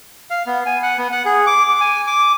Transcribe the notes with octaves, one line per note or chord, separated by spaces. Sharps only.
F5
B3
G#5
F#5
B3
F#5
G#4
D6
D6
G#5
D6